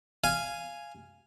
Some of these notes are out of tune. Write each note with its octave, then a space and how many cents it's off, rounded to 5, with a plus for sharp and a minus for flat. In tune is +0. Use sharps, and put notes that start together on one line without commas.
F5 -10 G#5 +0